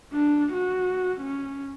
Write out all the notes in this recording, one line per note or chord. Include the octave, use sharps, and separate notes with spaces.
D4
F#4
C#4